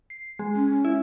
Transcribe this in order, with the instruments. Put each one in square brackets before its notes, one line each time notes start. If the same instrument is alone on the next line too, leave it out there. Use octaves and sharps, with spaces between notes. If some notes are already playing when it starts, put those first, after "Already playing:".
[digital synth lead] C7
G#3
[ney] C#4
[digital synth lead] E4